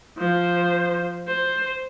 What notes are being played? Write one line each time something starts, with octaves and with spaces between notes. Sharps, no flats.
F3 C5
C5